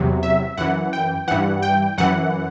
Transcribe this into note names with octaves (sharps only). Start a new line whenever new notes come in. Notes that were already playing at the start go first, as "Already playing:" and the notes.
Already playing: E2 C3 F#3
E5
F#2 E3 F#5
G5
G2 E3 F#5
G5
F#2 E3 F#5